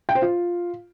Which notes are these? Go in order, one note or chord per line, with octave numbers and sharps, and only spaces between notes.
G5
C5
F4